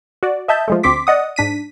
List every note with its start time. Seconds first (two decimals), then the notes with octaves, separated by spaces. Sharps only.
0.23 F#4 D5
0.48 D#5 E5 A5 G6
0.68 F3 G#3 A3
0.83 D2 C4 C6 D6 B6
1.07 D5 D#5 F#5 D#6
1.36 G#2 D4 B6 D#7